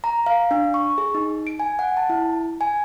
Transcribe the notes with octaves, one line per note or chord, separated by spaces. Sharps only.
A#5
F5
D4
C#6
G#4
D#4
D7
G#5
F#5
A5
E4
G#5